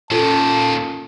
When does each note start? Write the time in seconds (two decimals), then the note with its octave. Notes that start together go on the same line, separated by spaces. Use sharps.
0.11 A#2 D#3 C#4 F4 A4 A5